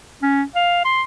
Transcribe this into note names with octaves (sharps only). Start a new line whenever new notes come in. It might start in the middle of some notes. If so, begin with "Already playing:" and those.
C#4
F5
C6